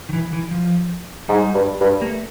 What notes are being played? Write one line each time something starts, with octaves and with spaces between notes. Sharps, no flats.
D#3
E3
E3
F3
G#2 G3
G2
G2
A#3
A3